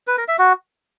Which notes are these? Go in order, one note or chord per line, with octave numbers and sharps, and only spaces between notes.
B4
A#4
E5
F#4